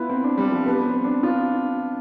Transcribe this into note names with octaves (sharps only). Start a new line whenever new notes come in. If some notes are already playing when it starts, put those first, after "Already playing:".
Already playing: B3 E4 F4
C4
D4
G3
F3
B3
C4
D4
F4